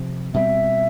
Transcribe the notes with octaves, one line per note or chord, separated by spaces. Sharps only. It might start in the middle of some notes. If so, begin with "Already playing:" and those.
Already playing: C3 F3 C4
B2 G3 C4 E5